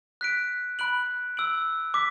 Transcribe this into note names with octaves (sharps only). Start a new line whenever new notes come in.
F#6 B6 D7
B5 F#6 D7 F#7
E6 D7 F#7
D6 B6